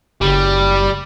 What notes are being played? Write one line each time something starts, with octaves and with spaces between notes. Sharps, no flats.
F#1 G3